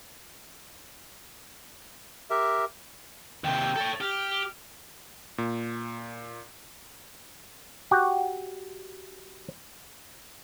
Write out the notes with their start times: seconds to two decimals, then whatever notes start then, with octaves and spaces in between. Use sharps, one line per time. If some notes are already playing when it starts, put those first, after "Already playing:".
2.30 G4 A#4 E5
3.44 D#2 C3 G5
3.76 A4 C#5
4.01 G4 F6
5.38 A#2
7.91 F#4 G4